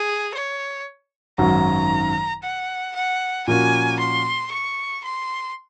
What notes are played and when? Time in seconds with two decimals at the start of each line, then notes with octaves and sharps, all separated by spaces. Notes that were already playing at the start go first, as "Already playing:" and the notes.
Already playing: G#4
0.35 C#5
1.38 G#1 F#2 D#3 F#3 A#5
2.43 F#5
2.95 F#5
3.47 A#2 F3 A#3 C#4 F#4 G#5
3.99 C6
4.51 C#6
5.04 C6